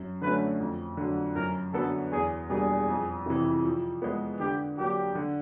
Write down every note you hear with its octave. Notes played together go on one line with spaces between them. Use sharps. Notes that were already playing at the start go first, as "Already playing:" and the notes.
Already playing: F#2
D3 F#3 A3 C#4 B4
F2
D3 F#3
F#2 A#4
D3 F#3 B3 A4
E2 G#4
B2 G3 A#3 D4 G#4
F2
C3 E3
F3
G#3 B3
D3 G4
F#3 A#3 D4 G4
D3